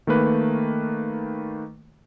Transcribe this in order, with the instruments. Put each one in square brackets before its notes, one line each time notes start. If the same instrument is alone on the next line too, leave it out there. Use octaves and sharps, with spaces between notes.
[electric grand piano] D#3 A3 A#3 B4